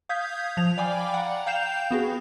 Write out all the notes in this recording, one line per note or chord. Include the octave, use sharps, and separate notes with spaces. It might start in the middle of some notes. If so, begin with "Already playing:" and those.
F5 D#6 G6 G#6 B6
F3 F7
D5 F5 G5 G#5 B5 D6
F#5 A#5
F5 G5 G6 C7 E7 F7
B3 F#4 G#4